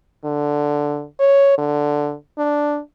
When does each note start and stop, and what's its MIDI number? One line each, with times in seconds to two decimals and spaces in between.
0.24 1.05 50
1.20 1.56 73
1.58 2.14 50
2.38 2.79 62